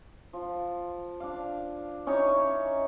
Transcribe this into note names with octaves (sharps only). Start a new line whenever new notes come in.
F3
D4 F5
C#4 D#4 E4 C#5